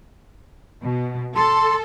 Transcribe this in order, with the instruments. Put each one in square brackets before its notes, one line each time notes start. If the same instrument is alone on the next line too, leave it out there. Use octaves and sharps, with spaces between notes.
[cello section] B2
[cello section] A4 [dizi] C6